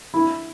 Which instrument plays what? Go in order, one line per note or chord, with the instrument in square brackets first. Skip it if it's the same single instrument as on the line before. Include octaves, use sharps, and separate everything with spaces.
[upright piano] E4